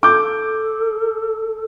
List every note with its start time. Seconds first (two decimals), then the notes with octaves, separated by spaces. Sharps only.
0.03 A4 D6 G6